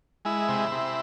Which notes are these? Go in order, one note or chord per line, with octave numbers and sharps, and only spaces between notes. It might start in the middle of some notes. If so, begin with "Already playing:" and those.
G#3 E4
C3
C3